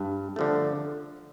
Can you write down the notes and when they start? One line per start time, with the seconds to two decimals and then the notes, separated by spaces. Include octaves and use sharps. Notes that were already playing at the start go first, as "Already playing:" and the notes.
Already playing: G2
0.36 D3 F3 A3